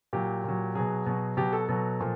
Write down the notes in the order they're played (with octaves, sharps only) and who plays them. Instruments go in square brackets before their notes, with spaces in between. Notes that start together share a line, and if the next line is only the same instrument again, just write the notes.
[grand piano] A#2 F#3 G4
A#2 F#3
B2 F#3 G#4
B2 F#3
B2 F#3 G4
A4
B2 F#3 A4
A#2 F3